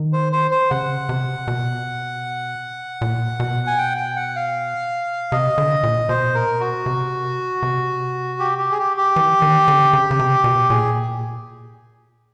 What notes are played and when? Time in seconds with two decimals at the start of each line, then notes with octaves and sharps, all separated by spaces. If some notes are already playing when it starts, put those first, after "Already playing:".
Already playing: D#3
0.13 C5
0.33 C5
0.51 C5
0.70 C#3 F#5
1.09 C3
1.48 B2
3.01 A#2
3.40 B2
3.67 G#5
3.78 G5
3.97 G5
4.16 F#5
4.36 F5
5.32 C3 D#5
5.58 D3
5.83 A#2
6.09 B2 C5
6.35 A#2 A#4
6.47 B2
6.60 F#4
6.86 C3
7.63 C3
8.40 G4
8.58 G4
8.71 G#4
8.79 G4
8.97 G4
9.16 E3
9.42 D#3
9.68 D3
9.93 C#3
10.11 C#3
10.19 C3
10.44 B2
10.70 A#2 G#4